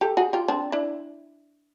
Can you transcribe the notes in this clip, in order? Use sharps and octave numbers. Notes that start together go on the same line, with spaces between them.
G4 A4
F#4 G#4
F4 G4
C4 D4
D4 E4